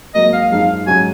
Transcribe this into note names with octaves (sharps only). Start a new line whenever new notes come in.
G#2 F#3 A#3 D#5
F5
F#2 F3 G#3 D#4 F5
G#2 F#3 C#4 F#4 G#5